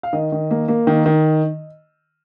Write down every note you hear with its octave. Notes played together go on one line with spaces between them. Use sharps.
F5
D#3 D#5
D#3
A#3
A#3
D#3
D#3